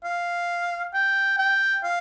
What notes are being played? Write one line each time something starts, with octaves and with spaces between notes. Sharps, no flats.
F5
G5
G5
F5